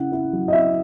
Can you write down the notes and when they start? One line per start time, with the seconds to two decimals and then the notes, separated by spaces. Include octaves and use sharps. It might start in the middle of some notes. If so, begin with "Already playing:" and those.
Already playing: C#3 E4 F#5
0.12 E4
0.33 F#3
0.48 D#5
0.52 E4 E5